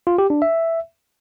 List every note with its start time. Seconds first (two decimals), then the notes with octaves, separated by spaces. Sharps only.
0.07 F4
0.18 G4
0.30 D4
0.42 E5